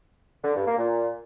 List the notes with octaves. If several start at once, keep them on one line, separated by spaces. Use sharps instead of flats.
D3
G2
A#3
A#2